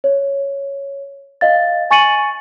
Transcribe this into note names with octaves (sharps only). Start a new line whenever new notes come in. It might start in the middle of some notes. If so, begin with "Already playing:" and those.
C#5
D#5 F5 A6
G#5 C#6 A6 C#7 D#7 F#7